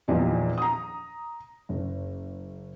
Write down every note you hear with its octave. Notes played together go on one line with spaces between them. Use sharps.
E2 A#2 D#3 F3 G3 D#4
A#5 D#6
F#1